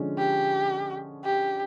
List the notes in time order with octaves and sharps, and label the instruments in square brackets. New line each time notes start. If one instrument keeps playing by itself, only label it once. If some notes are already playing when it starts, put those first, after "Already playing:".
Already playing: [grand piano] D3 F3 G#3 C#4
[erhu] G4
G4